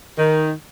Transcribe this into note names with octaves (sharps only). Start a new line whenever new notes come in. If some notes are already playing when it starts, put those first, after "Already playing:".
D#3